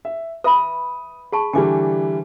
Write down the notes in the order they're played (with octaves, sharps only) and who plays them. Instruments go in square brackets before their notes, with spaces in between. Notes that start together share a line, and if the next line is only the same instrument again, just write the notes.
[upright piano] E5
[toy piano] B4 E5 B5 [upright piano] D#6
[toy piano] G#4 A5 C#6 [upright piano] B5
[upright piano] D3 E3 G3 [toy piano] G#5 D6